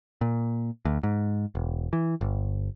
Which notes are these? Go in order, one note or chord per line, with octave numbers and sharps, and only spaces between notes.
A#2
D2
G#2
E1
E3
G1